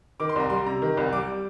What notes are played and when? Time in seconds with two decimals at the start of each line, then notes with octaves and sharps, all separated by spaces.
0.20 D#3 D6
0.29 C6
0.35 C2 A#5
0.50 G3 C6
0.66 C3 A#5
0.82 D#3
0.97 C2
1.12 G3 D6